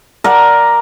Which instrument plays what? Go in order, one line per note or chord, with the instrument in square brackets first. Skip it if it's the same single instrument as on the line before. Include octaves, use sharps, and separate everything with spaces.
[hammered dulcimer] A#4 D5 F#5